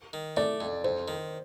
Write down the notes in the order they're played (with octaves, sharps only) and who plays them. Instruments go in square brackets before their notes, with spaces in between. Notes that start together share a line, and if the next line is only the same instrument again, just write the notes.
[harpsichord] D#3
[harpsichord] A3 [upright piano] D5
[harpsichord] F2
[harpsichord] F2 [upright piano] C5
[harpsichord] D#3